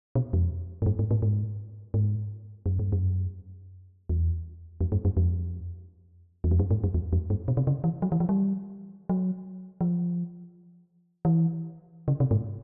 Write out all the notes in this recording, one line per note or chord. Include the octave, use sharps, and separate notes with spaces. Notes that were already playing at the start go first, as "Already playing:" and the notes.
B2
F2
G#2
G2
G#2
A2
G#2
G#2
F#2
G2
F#2
E2
F2
G2
F#2
F2
E2
F2
F#2
G#2
F#2
E2
F2
G2
B2
C3
C#3
E3
F#3
E3
F3
G3
F#3
F3
E3
C#3
C3
G#2